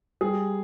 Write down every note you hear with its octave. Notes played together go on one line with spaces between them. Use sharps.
G3 G#4